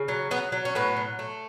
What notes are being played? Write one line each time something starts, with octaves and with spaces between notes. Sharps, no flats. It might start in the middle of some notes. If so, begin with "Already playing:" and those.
Already playing: C#3
F#3
F#3 B3
F#3
C#4
A2 B3
F#3
A3